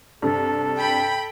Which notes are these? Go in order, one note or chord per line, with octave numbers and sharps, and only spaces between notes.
G2 C3 A4
G5 B5